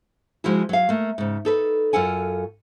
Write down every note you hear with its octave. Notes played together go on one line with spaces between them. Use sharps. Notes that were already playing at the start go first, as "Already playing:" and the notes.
F3 G#3 E4 F#4
F#3 F5
A3 A#3
G#2 C#3
D#4 A4 B4
F#2 F4 A4 F#5 G#5